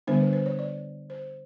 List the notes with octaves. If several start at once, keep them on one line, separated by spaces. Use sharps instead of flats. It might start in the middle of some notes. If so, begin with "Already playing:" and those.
D3 G3 B3 D4 C5
B4
C5
C#5
D5
C5